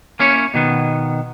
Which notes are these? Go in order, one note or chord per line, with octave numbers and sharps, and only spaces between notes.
A#3 C#4 E4 C#5
B2 D#3 B3